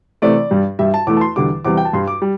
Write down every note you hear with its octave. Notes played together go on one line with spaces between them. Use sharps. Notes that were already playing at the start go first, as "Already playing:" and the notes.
C3 E3 A3 D5
G2 G3
G2 G3 E5
A5
E2 E3 A3 D6
A5
C6
E2 D3 G3 D6
E2 C3 G3 D6
G5
A5
G2 G3 C6
D6
G3